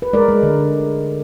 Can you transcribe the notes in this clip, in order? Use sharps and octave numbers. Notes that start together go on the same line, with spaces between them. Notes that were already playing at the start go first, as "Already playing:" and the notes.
B4
G#3 A#4 D5
G#3
D3